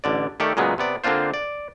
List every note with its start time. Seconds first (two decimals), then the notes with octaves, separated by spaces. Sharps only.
0.04 A1 D3 D5
0.40 D#3 A3 G4 A4 D5
0.57 A#2 C#3 F#3 G#3 B3
0.78 C3 B3 D5
1.04 D3 A#3 C4 D4 F4 C5
1.34 D5